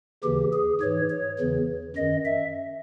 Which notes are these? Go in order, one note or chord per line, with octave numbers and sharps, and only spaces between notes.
D#2 C#3 E3 G4
G#4
G#2 E3 C#5
C#5
E2 C#3 E3
F#2 D#3 D#5
E5